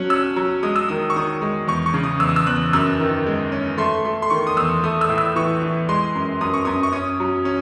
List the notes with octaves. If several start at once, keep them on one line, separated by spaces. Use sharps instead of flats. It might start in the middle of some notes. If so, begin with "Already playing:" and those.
Already playing: F#3 C#4 F#6
C#4 E6
F#3
G#3 D#6
E6
D#3 D#6
C#6
D#3 D#6
G#3
E2 C#6
C#6
C#3
D#6
E2 E6
D#6
E6
E2 F#6
F#2 E6
D#3
G#3
C#4
A3 C6
A3
C6
D#3 C#6
D#6
E2 E6
A3 D#6
E6
A2
E6
E3 C#6
E3
G#3 C6
F#2
F#2 D#6
C#6
F#2 D#6
C#6
C#4 D#6
F#3
C#4